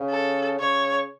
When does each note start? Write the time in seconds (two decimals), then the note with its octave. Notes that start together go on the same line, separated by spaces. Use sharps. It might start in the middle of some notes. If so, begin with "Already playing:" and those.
Already playing: C#3
0.10 A4
0.60 C#3 C#5